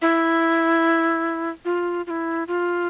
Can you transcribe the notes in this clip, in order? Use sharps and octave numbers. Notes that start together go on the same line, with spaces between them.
E4
F4
F4
E4
F4